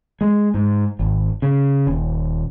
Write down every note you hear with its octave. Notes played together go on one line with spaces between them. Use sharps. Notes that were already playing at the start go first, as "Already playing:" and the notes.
G#3
G#2
G#1
C#3
D#1